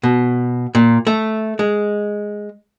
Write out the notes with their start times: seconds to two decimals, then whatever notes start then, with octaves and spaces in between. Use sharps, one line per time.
0.03 B2
0.75 A#2
1.07 A3
1.59 G#3